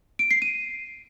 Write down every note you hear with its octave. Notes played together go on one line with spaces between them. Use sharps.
D7
C7
D#7